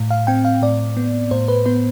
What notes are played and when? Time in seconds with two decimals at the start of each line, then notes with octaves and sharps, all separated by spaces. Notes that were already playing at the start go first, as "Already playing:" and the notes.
Already playing: A2
0.10 F5
0.27 C4 G5
0.45 F5
0.62 A2 D5
0.97 B3
1.31 A2 C5
1.48 B4
1.65 B3 B4